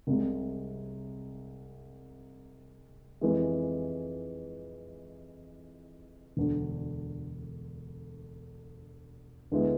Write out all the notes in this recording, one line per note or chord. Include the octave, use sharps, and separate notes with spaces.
C2 C3 G#3
F2 E3 G#3
E1 D2 D3
D2 D3 G#3 B3 E4